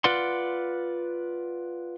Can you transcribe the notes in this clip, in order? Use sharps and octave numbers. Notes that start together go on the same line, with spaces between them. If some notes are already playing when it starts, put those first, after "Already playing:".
F4 B4 D5 F#5 C6